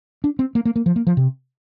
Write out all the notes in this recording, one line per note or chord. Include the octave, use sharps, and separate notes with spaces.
D4
C4
A#3
A#3
A#3
F3
A#3
F3
C3